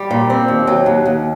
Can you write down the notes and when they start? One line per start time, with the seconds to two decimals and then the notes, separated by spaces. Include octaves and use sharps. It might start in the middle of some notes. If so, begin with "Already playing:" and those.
Already playing: G3
0.11 A#2
0.30 C4
0.48 D#2
0.67 F#3
0.86 D#2
1.06 D#2